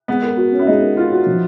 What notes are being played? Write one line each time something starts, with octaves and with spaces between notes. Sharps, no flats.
G#3 B3
A#4
F#4
C#4
E4
G#3 D#4
A#4
F4 A#4
F#4
F3